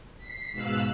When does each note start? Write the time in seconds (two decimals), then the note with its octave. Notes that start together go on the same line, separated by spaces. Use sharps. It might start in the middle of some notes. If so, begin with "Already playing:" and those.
0.18 B6 C7
0.51 G#2 B2 F5 E6 F#6